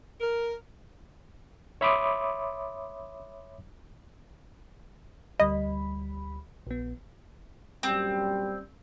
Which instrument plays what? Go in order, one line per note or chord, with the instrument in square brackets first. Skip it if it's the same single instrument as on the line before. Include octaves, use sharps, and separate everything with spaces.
[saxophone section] A#4
[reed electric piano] C#5 E5 B5 C6 D6 D#6
[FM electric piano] D2 G3 B5 [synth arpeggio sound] D#5
[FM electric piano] A#1 B3
[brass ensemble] F#2 A#2 G3 [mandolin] C4